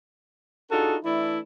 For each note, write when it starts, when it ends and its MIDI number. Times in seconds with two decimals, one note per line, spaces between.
0.70 0.96 62
0.70 0.96 63
0.70 0.96 65
0.70 0.96 66
0.70 0.96 68
0.70 0.96 69
1.04 1.38 52
1.04 1.38 57
1.04 1.38 62
1.04 1.38 64